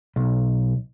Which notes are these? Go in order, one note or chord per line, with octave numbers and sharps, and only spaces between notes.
B1